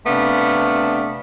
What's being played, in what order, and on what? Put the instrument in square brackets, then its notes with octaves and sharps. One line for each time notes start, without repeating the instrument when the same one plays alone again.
[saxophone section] C3 A3 B3 D4 F5